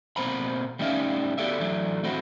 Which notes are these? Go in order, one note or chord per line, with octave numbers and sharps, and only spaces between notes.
B2 A#3 C4 C5 A#5 B5
G3 A3 C#4 D#4 E5 F5
B3 F#4 G4 A4 D5 E5
E3 F#3 A3 D4
A3 C4 E4 F#4